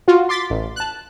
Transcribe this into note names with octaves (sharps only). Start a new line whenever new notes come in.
F4 F#4
C6 D6 A6 B6
A1
A5 F#6